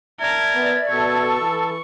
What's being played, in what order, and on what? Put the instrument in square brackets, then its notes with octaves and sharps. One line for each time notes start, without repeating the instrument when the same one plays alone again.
[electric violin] A#4 A5 [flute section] D5 E5 G#6
[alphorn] B3
[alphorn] B2 [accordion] A4 [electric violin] C#6
[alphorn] E3